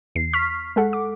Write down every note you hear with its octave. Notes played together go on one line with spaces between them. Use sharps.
E2 C7
C#6 F6 B6
G#3 A4 F#5
D6